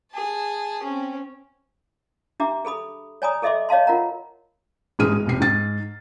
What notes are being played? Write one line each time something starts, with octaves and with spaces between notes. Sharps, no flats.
G#4 A5
C4 C#4
D4 G4 E5 A#5 D6
G#4 A4 B5 D#6
C#5 D5 G#5 A#5 B5 D#6
G#4 A4 D#5 E5 C6 D6
C#5 D#5 F5 A5 C6
F4 A#4 F#5 A#5
A1 G#2 G#4 F6 D#7
G#3
F1 C3 C7
G#2 A6